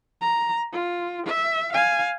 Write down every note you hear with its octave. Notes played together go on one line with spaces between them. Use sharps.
A#5
F4
E5
F5 G#5